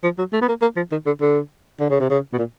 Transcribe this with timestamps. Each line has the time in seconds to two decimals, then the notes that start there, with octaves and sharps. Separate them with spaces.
0.04 F3
0.18 F#3
0.33 A3
0.42 B3
0.48 A#3
0.62 A#3
0.76 F3
0.92 D#3
1.06 D3
1.22 D3
1.80 D3
1.90 C#3
2.00 C3
2.10 C#3
2.33 B2
2.38 A#2